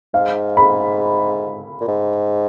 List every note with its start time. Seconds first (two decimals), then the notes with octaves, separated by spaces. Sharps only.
0.14 G#2 F5
0.57 B5
1.80 A#2
1.88 G#2